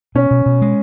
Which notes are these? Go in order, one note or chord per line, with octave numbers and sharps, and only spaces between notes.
B2 C#4
B2
B2
G#3